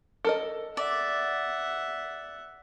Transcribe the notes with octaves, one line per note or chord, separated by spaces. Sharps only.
A4 A#4 D#5
D5 E5 F#5